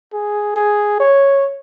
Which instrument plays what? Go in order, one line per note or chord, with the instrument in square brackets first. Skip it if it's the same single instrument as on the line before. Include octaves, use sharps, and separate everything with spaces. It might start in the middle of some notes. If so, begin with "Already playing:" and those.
[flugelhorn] G#4
G#4
C#5